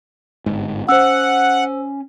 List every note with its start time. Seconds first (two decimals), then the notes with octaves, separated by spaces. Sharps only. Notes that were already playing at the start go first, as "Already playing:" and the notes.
0.46 G1 G#2
0.89 C#4 C5 F#5 E6